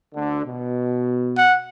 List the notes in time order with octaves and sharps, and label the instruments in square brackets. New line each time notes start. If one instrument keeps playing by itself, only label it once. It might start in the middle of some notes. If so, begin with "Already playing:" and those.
[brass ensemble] D2 D3
B2
[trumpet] F#5